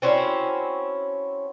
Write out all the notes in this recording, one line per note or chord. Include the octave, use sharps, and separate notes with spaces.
C4 C#4 E4 F#4